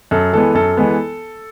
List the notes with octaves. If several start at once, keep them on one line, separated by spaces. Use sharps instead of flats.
F#2 A4
E3 G#3 B3 A4
F#2 A4
E3 G#3 B3